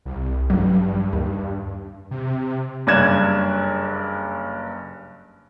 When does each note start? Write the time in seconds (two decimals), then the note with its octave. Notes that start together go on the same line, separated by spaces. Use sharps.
0.05 C2
0.50 A1 G2 F#3
1.13 D#2
2.11 C3
2.87 F#1 G2 D5 F#6 G#6 E7